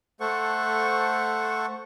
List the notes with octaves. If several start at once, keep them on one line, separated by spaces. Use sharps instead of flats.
A3 A4 C5 F#5 C#6